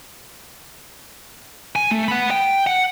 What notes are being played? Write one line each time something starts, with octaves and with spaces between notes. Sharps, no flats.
G#5
A3
F#5 B5
G5
F#5